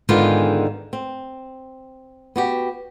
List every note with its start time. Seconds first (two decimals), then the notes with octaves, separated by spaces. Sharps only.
0.09 G#2 D3 D#3 G#3 B3 F4
0.93 C4
2.36 B3 F#4 G4